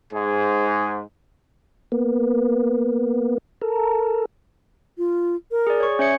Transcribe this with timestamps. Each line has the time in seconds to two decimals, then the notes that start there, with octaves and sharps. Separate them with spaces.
0.13 G#2 G#4
1.92 A#3 B3
3.62 A4 A#4
4.98 F4
5.51 A#4
5.67 G#4 D5
5.80 C#5 C#6
5.99 C#4 C#5 E5 C#7